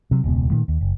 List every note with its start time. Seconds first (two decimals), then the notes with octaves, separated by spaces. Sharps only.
0.11 C3 F#3
0.24 E1 C#2 B2
0.50 A#2 D#3 A3
0.68 D#2
0.81 F#1